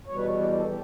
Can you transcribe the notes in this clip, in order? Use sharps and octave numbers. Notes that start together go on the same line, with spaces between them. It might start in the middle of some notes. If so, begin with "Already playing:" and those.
E2 B2 G3 C#5
B4
C#5
D5
A4
G4